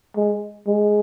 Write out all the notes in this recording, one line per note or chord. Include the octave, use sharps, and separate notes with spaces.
G#3
G#3